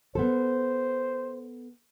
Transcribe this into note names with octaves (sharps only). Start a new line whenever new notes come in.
B3 A4 C5